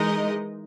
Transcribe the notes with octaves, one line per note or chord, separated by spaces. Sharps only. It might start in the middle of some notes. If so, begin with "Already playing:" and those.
Already playing: E3 G#3 D#4 A#4 D#5